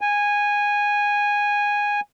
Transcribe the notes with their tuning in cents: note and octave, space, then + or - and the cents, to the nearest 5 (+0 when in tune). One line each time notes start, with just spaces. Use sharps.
G#5 -10